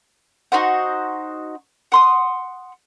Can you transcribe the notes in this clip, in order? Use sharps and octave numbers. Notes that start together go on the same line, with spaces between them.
D#4 F#4 C5 F#5
F#5 C6 D#6